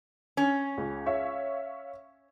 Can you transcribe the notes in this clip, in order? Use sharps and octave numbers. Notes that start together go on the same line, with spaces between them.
C#4
C#2
C#5 E5 F5